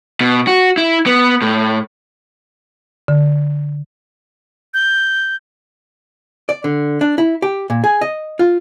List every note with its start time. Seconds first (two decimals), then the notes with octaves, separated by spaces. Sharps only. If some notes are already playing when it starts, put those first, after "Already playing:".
0.21 B2
0.47 F#4
0.77 E4
1.06 B3
1.42 A2
3.08 D3
4.74 G6
6.49 D5
6.64 D3
7.01 D4
7.18 E4
7.42 G4
7.70 A#2
7.84 G#4
8.01 D#5
8.39 F4